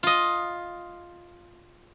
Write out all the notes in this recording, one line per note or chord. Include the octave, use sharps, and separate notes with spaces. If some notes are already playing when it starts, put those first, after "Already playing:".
F4 D#5